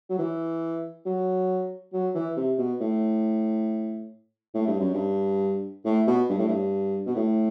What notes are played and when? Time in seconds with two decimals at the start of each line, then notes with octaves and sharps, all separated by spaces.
0.10 F#3
0.19 E3
1.06 F#3
1.93 F#3
2.15 E3
2.37 C3
2.58 B2
2.80 A2
4.54 A2
4.67 G2
4.80 F#2
4.93 G2
5.85 A2
6.07 B2
6.29 G2
6.38 A2
6.48 G2
7.06 B2
7.16 A2